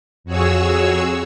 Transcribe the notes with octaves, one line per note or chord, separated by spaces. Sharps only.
F2 F#4 G#4 C#5 E6